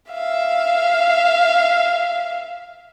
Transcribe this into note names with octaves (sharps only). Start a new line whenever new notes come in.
E5 F5